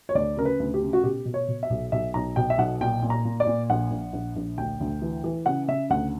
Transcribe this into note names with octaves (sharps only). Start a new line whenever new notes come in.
C#5
D2 D5
C#3 A#4
B4
D2
G4
C#3
F#4
B2 G4
B2
C#5
B2
E5
B1
B1 E5
B1 A#5
B2 G5
E5
B1 F#5
A#2 G5
A#2
A#5
A#2
D5
A#2
A#1 F#5
A#1
A#1
A#1
D2 G5
D2
E3
E3
C#3 F#5
C#3 E5
D2 F#5